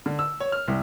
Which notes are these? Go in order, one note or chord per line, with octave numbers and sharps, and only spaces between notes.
D3
E6
C#5
F6
C2